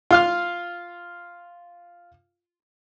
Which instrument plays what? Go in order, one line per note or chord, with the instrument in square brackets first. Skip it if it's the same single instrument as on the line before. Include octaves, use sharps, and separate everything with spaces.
[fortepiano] F4 F5 F6